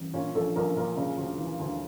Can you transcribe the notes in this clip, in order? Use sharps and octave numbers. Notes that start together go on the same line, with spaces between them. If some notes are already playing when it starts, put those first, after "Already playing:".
Already playing: A1
A#2 C#4
A#1 A4
A#1 A#4
A#2 A#4
C#3
D2
E3
D2